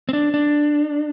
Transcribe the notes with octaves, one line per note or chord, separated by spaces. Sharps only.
C4
D4
D4